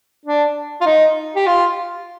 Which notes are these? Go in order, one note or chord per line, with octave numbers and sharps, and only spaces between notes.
D4
F4
D#4
G4
F4